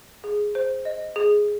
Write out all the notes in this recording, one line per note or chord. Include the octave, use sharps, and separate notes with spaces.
G#4
C5
D#5
G#4